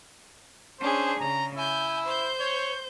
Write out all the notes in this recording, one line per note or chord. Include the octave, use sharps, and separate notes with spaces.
C#4 D4 G#4 C5
C#3 A#5
E4 G#5 G6
C5 G6
C#5